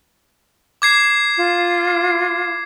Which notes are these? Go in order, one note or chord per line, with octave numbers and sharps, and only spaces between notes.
D6 G#6 C7
F4